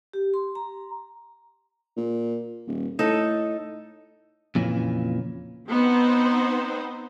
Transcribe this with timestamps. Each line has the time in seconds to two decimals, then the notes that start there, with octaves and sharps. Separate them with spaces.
0.13 G4
0.34 C6
0.55 A#5
1.97 A#2
2.67 D#1
2.99 A2 D#4 A4
4.55 F2 A#2 C#3 E3 C#4
5.69 B3 C4 D#4 C5